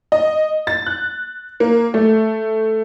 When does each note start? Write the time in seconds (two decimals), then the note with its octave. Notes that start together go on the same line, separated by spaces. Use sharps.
0.12 D#5
0.67 A6
0.86 F#6
1.60 A#3
1.94 A3